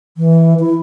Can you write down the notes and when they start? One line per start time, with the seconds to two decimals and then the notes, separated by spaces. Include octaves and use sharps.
0.17 E3
0.60 E4